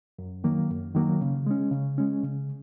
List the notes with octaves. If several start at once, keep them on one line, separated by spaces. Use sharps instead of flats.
F#2
D#3 F#3 A#3
F#2
D#3 F#3 A#3
C#3
G#3 C#4
C#3
G#3 C#4
C#3